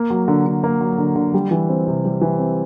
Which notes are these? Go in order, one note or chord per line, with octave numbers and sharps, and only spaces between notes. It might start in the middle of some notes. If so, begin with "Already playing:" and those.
Already playing: A#3
F#3
D3
D3
A#3
F#3
D3
D3
G3
E3
C4
C3
G3
E3
C4